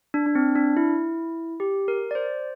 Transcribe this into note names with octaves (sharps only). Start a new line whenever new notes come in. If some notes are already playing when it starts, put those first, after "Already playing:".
D4
D4
C4
D4
E4
G4
A#4
D5
C5